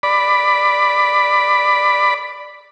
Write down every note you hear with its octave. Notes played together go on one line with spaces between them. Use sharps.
D5 B5